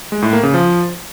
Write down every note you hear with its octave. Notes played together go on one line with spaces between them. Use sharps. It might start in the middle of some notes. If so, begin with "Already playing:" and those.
G#3
A2
A#3
C#3
F3